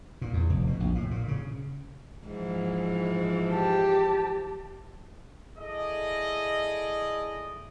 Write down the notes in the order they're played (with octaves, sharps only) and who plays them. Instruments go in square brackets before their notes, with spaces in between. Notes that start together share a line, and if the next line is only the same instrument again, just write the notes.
[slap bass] A#2
E2
F1
B2
A#1
A2
A#2
C#3
[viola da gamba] G#2 E3 F3
[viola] G4 [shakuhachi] A5
[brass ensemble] E4 G#4 A4 D5 D#5